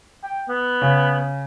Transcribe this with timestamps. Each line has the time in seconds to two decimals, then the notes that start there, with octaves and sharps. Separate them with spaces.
0.23 G5
0.49 B3
0.81 C#3